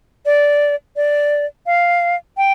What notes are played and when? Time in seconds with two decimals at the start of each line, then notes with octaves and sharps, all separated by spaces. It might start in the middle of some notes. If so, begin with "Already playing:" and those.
0.26 D5
0.96 D5
1.66 F5
2.37 G5